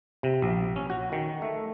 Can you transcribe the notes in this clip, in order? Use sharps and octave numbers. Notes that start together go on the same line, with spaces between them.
C3
A#1
C#4
F#4
D#3
A3